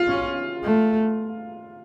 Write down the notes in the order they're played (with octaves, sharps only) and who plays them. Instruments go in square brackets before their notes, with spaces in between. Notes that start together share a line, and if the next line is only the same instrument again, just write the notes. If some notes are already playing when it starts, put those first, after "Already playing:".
Already playing: [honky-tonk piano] F4
[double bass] C#4
A3